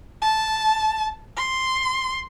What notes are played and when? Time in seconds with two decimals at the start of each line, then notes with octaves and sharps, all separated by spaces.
0.22 A5
1.37 C6